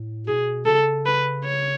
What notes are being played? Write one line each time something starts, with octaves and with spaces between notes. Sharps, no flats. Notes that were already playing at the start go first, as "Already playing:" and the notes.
Already playing: A2
B2 G#4
C#3 A4
B4
C#5